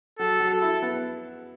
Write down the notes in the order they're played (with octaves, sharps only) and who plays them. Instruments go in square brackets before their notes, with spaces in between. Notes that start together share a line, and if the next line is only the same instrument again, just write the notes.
[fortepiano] F#3 [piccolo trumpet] A4
[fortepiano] F#3
[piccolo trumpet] A4
[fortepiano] E4
B3